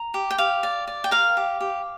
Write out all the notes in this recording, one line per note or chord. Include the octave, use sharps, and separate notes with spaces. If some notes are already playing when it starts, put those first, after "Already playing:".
Already playing: A#5
G4
G5
G4 F5
D5
D5
G5
A#4 F5
G4
G4